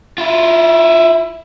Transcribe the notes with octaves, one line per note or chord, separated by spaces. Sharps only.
E4 F4